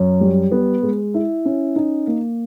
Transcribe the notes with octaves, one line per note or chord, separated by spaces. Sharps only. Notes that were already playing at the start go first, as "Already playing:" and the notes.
Already playing: F#2 F#3
G3
B3
G#3
E4
C#4
D#4
A#3